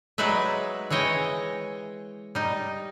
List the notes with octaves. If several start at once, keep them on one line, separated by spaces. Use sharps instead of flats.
F#3 G#3 D#4 B4 D5 E5
E3 G#3 C#5 D#5 G5
G3 D#4